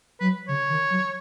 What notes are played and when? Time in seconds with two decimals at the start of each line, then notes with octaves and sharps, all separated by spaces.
0.20 F#3 B4
0.48 C#3 C#5
0.69 D#3
0.90 F#3